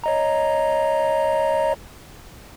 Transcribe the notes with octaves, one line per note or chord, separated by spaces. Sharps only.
C#5 D#5 A#5